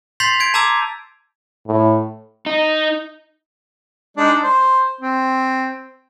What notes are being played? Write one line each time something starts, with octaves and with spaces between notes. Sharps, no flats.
C6 G6 A6 B6 C7 F7
G6 G#6 D7
A5 A#5 D6 E6 G#6
A2
D#4
G#3 D4 D#4
C5
C4